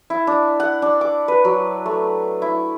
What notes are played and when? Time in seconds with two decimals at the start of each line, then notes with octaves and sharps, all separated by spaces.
0.10 E4
0.27 D4
0.60 F#5
0.82 D4
1.01 D6
1.28 B4
1.45 F#3
1.86 A3
2.42 E4